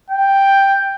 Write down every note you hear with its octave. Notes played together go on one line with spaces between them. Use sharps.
G5